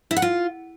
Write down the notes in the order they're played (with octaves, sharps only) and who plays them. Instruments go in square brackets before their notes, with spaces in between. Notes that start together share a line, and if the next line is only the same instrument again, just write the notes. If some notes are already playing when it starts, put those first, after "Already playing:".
[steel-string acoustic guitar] E4
F#5
F4